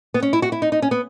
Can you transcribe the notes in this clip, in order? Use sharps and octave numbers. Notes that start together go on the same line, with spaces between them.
B3
C#4
E4
F#4
E4
D#4
D#4
C#4
B3